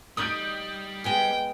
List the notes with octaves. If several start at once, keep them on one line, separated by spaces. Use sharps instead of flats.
G3 D#4 D5 D#6 G6 D7
G#3 B3 G#4 G5